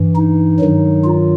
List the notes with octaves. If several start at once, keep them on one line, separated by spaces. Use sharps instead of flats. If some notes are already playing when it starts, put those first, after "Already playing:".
Already playing: G2 E3
D#4
G2 D#3 F#3
F4